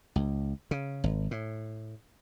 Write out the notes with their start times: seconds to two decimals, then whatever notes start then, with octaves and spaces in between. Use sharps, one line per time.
0.16 C#2
0.71 C#3
1.04 G#1
1.31 A2